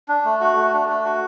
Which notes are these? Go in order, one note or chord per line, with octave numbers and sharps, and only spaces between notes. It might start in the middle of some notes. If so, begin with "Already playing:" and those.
D4
A3
F#4
A3
D4
A3
F#4